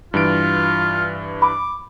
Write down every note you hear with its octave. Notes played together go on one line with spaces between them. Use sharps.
G2 E3 F4 D7
B5 D6